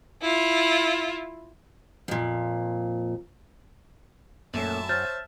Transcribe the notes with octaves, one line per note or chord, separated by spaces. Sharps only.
E4 F4
F2 A#2
F#2 A#2 A3 C#4 E5 A5
C5 C#5 F6 G6 A6